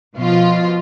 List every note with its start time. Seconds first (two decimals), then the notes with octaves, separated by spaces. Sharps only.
0.16 B2 F3 F4